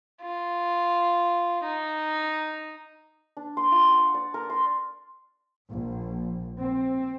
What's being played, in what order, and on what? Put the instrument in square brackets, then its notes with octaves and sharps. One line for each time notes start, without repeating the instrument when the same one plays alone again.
[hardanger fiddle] F4
D#4
[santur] D4
C6
F4
F#5
D5
A#4
C6
[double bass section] A#1
C4